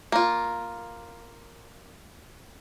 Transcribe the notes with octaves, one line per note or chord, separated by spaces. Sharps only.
A#3 F4